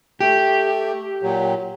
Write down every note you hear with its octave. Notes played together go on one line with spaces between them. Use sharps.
A3 G4
A#2 F#3